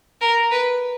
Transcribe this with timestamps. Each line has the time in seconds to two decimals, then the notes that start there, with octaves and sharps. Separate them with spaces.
0.21 A#4
0.51 B4